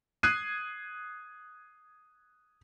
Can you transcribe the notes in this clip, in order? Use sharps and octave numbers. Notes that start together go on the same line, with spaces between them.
D#6 F#6 G#6 C7 D#7